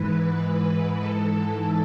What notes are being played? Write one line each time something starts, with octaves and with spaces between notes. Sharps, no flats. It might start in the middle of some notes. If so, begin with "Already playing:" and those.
Already playing: G#2 E3 B4
A4